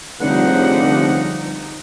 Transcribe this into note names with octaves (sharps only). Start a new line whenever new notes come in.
F1 C#2 G2 D3 F3 G3 D#4 F#5